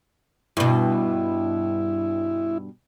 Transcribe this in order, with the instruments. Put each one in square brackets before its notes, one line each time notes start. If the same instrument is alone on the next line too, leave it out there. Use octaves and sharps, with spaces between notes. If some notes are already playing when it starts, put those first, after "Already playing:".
[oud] G2 B2 [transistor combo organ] E4